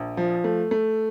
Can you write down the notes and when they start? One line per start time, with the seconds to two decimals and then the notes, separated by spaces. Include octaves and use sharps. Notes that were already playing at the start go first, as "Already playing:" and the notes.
Already playing: A#1
0.17 F3
0.44 A3
0.71 A3